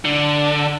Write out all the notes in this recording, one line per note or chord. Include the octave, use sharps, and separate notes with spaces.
D3